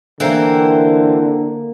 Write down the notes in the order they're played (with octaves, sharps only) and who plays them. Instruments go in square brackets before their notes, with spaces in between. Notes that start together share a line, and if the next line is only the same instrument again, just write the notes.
[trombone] D3 [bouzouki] E3 C4 [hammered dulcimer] A#3 A#4 F5